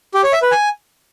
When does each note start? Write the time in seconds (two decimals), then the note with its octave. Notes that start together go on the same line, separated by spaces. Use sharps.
0.14 G4
0.24 C#5
0.33 E5
0.42 B4
0.52 G#5